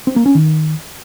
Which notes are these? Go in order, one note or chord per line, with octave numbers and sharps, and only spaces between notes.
C4
A#3
C#4
D#3